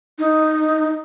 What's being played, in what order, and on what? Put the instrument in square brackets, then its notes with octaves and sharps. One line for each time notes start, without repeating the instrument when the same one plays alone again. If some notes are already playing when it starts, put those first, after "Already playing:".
[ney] D#4